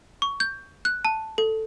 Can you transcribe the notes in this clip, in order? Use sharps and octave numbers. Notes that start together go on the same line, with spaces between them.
C#6
G6
F#6
A5
A4